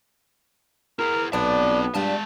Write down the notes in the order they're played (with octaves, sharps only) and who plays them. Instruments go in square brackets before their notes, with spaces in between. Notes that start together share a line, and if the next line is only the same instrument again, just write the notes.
[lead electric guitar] E4 G#4 [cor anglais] A#4
[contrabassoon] B1 [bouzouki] A#2 D5 [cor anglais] B3 [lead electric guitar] C4 A5
[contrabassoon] G2 [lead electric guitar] G#3 A5 [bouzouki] D4 F4 G4